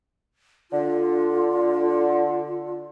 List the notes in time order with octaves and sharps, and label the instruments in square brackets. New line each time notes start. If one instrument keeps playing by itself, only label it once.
[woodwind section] D3 [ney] F4